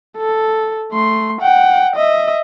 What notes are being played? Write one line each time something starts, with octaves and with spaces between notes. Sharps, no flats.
A4
A3 C6
F#5 G5
D#5 E5